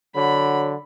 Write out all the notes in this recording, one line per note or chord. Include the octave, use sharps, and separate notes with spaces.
D3 F#3 B5